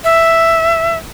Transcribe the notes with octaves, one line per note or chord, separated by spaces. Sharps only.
E5